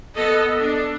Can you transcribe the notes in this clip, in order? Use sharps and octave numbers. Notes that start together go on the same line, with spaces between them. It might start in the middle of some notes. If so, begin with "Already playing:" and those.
B3 A4 D#5
D4